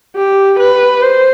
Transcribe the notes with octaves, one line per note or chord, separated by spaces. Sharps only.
G4
B4
C5